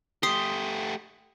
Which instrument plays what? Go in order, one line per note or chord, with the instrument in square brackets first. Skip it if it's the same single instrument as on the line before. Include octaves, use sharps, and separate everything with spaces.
[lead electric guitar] A3 G4 [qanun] C6 [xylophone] D#6